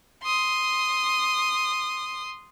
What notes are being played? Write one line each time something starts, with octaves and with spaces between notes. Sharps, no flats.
C6 D#6